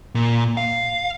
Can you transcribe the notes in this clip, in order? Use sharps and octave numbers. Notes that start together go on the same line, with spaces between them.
A#2
F5